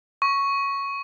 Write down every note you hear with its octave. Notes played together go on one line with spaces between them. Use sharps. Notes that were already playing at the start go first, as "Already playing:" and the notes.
C#6